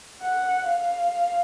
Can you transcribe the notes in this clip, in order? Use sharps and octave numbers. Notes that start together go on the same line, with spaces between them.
F#5
F5